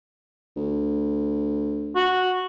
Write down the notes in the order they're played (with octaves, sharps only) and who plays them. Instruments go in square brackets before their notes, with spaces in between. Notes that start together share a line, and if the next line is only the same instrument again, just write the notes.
[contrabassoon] D2
[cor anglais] F#4